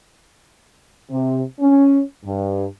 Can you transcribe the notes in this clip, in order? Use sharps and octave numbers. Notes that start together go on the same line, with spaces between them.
C3
C#4
G2